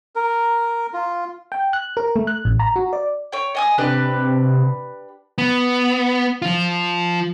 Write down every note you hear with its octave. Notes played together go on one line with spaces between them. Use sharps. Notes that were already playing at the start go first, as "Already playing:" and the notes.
A#4
F4
G5
F#6
A#4
A3
F#6
A1
A#5
F#4
D5
C#5 G5
D#5 G#5 D#6
C3 D4 G4 B4
B3
F3 F4